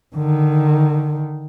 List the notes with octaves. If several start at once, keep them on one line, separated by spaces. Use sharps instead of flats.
D3 D#3